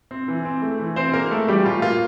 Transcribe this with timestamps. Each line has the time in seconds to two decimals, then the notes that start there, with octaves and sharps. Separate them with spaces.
0.11 C4
0.28 E3
0.45 C4
0.62 A3
0.79 E3
0.96 E3 C4 C5
1.13 A#3 C4 A#4
1.31 A3 A4
1.48 E3 G3 G4
1.65 A2 F4
1.82 A#3 F4